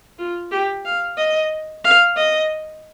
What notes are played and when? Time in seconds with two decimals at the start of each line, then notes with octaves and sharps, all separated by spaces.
0.19 F4
0.52 G4
0.85 F5
1.17 D#5
1.84 F5
2.17 D#5